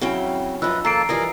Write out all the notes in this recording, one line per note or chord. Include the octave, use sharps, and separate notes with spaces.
C#3 F#3 C4 C#4 E4 G5
F#2 F3 D#4 B4 E6
D#3 A#3 A4 A5 A#5 C7 D7
E3 F3 G3 F4 A#4 D5 D#5 G#5